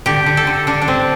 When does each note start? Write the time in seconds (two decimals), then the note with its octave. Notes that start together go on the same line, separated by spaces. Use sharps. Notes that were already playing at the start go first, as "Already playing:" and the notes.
0.06 D3 G4
0.26 D3
0.37 A4
0.47 D3
0.67 D3 D4
0.82 D4
0.88 D3 C4